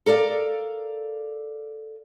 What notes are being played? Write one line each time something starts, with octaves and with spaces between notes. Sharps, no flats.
A4 A#4 D5 F5